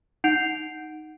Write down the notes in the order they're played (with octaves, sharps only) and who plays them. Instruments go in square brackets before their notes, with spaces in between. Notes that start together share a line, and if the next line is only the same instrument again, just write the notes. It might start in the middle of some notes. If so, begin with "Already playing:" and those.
[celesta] D#4 F#5 G6 C7 D7 F7